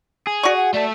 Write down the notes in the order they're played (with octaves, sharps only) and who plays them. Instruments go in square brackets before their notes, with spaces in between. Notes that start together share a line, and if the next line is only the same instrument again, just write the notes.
[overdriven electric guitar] G#4
[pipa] F#4 C#6 [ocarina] D5
[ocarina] F#5
[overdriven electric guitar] A3 A4 [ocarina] D5